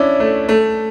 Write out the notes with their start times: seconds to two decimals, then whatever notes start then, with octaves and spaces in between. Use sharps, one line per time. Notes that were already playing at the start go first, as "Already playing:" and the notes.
Already playing: C#4 D4 E4
0.20 A3
0.49 A3